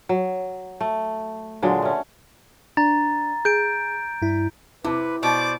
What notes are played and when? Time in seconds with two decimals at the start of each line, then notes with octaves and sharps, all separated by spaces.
0.09 F#3
0.81 A3
1.62 A#2 D3 F#3 G#3
1.82 A3 C#4
2.77 D4 A#5 A6
3.45 G#4 G6 D7
4.22 G2 E4
4.84 C3 E4 B4
5.23 B2 C5 D5 D6